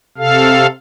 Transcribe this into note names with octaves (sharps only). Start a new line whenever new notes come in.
C3 A4 F5